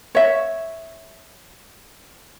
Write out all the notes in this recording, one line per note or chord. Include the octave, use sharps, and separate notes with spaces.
C#5 E5